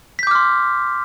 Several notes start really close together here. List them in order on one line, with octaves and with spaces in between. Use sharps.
B6 G6 D6 F6 C6